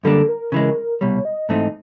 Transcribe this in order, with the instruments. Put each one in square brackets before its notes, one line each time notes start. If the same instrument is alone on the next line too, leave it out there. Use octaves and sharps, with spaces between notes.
[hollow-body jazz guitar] F#2 D3 G3 A#3 D4 [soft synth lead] A4
[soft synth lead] A#4
[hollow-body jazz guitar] C#3 E3 G#3
[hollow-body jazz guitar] C2 B2 G3 [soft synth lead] C#5
[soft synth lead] D#5
[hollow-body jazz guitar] G#2 E3 A3 C4 D#4